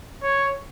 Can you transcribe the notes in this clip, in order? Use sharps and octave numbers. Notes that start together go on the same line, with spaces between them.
C#5